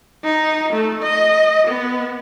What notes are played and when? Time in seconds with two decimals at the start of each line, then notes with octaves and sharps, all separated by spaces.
0.24 D#4
0.73 A3
1.03 D#5
1.67 B3